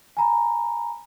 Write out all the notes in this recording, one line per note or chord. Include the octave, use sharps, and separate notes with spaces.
G#5 A#5 B5